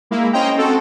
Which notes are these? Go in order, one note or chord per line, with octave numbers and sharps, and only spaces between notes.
G#3 A#3 E4
C#4 C5 D#5 G5 A#5
C4 F#4 A4